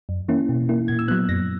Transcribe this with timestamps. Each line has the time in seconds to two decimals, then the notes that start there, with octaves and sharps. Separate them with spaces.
0.09 F#2
0.28 E3 A#3 C#4 E4
0.49 B2
0.69 A#3 E4
0.88 A#2 G#6
0.99 E6
1.08 F#3 B3 F#6
1.29 F#2 A#6